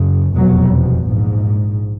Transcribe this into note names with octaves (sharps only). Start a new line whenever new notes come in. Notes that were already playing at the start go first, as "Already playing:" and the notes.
Already playing: F#1 F#2 C#3
F1 E2 B2 F#3
A#1 G#2